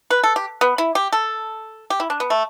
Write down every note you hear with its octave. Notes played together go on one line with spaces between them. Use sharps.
B4
A4
G4
B3
E4
G4
A4
G4
E4
D4
B3
A3